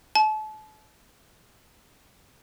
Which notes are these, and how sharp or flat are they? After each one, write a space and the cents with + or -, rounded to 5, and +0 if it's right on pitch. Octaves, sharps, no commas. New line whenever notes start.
A5 -35